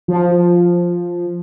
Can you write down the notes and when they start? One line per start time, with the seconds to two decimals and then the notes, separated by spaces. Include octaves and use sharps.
0.08 F3